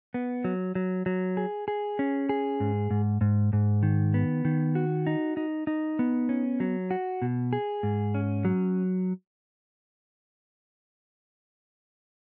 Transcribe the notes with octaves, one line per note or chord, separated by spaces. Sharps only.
B3
F#3
F#3
F#3
G#4
G#4
C#4
G#4
G#2
G#2
G#2
G#2
D#3
B3
D#3
F#4
D#4
D#4
D#4
B3
C#4
F#3
F#4
B2
G#4
G#2
C#4
F#3